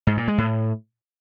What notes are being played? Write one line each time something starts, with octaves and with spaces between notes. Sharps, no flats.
G#2
A#2
G#3
A2